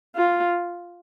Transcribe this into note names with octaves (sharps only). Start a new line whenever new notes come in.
F4